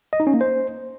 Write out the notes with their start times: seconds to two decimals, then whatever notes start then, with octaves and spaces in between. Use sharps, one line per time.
0.13 D#5
0.20 D#4
0.27 C#4
0.34 A#3
0.41 C5